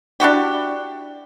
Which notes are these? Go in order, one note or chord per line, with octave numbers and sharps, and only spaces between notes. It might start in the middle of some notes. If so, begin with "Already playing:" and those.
D4 E4 F#4 G4